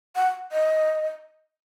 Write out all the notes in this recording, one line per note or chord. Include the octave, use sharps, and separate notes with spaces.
F#5
D#5